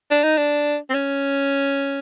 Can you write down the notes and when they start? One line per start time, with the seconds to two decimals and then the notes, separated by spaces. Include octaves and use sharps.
0.11 D4
0.23 D#4
0.37 D4
0.90 C4
0.94 C#4